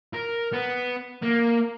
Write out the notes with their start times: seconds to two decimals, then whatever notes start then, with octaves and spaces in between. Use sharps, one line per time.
0.14 A#4
0.53 B3
1.22 A#3